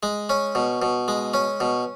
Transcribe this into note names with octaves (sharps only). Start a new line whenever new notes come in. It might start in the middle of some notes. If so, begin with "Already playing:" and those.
G#3
C#4
B2
B2
G#3
C#4
B2